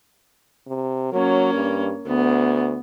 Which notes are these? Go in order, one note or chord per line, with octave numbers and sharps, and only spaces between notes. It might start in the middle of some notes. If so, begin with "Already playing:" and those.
C3
F#3 A#3 C#4
G2
D2 B3